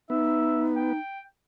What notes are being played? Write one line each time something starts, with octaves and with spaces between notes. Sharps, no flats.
B3 D#4 E5
G5